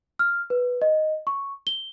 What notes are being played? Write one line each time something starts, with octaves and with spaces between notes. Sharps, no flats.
F6
B4
D#5
C#6
G7